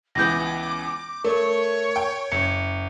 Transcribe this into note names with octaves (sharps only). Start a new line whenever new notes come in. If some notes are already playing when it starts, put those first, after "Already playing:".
C#2 E3 B3 D6 G6 A#6
A3 A#4 C#5
G5
F#1 C#7